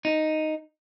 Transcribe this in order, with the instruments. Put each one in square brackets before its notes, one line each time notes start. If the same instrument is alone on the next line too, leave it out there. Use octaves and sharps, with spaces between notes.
[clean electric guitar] D#4